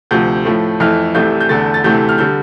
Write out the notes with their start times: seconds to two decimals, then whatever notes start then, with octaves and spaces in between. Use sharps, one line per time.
0.11 D2 C3 F3 G6
0.45 A2 F3 A3
0.80 F2 E3 A3 F6
1.15 C2 C3 E3 A3 G6
1.41 G6
1.49 E2 D3 A3 A6
1.74 A6
1.84 D2 C3 E3 A3 G6
2.09 F6
2.18 D3 G3 G6